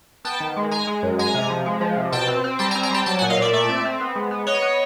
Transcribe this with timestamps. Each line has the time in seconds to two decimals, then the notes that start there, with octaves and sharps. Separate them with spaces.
0.25 B3 G5 A5
0.40 D#3
0.57 G#3
0.71 G#3 G#5 A#5
0.87 G#3
1.03 F#2
1.18 G#3 G#5 A#5
1.35 C3
1.50 F3
1.66 G#3
1.81 F3
1.97 C3
2.12 B2 G5 A5
2.28 C4
2.44 C4
2.59 G3 G5 A5
2.71 G#5 A#5
2.76 C4
2.83 G#5 A#5
2.90 G3 G5 A5
3.06 F#3 G5 A5
3.19 F#5 G#5
3.22 A#2
3.30 D#5 F5
3.37 A#2 D5 E5
3.53 A3 D5 E5
3.69 C4
3.85 C4
4.00 B3
4.16 G#3
4.31 B3
4.47 B3 C#5 D#5
4.62 B3